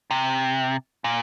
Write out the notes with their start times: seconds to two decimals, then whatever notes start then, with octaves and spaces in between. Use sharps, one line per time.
0.11 C3
1.04 A#2